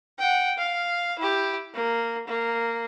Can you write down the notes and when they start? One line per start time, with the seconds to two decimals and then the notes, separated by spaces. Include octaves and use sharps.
0.19 F#5 G5
0.58 F5
1.19 E4 G4
1.75 A#3
2.27 A#3